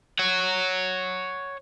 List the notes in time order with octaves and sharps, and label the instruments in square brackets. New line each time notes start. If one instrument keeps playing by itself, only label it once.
[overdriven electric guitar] C#5 F#5